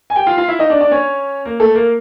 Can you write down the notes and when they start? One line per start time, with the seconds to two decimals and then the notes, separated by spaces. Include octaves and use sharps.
0.10 G#5
0.16 G4 G5
0.27 F4 F5
0.37 F4 F5
0.48 E4 E5
0.59 D#4 D#5
0.70 D4 D5
0.81 D4 D5
0.91 C#4 C#5
1.45 A#3 A#4
1.60 A3 A4
1.75 A#3 A#4